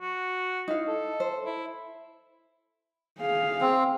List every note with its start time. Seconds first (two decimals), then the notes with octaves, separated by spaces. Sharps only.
0.01 F#4
0.68 D#4 E4 F5
0.88 A4
1.20 C5
1.46 E4
3.20 G#4 F5
3.61 C4